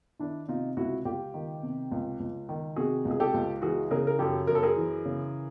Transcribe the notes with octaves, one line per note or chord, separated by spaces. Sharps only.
D#3 D4 E4
C3 D#4 F4
C#2 E4 F#4
C#2 F4 G4
D#3
C3
C#2
C#2
D#3
C3 F#4 G#4
C#2
G#4
G4 A4
C#2
E3 F#4 G#4
C#3 G#4 A#4
A#4
F#2 G4 A4
F#2 A#4
A4
G#4 A#4
E3
C#3